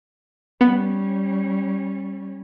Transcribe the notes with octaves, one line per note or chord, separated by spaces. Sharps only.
G3 B3 C#4